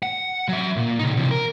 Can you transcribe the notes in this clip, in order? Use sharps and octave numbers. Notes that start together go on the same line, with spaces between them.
F#5
F#3 E5
A#2
C#3 D#4
C3 E3
A#4